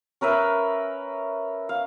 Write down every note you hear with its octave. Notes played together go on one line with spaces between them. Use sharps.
C#4 A#4 B4 E5
F5